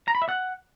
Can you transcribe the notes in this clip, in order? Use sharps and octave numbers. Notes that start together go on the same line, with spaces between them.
A#5
B5
E5
F#5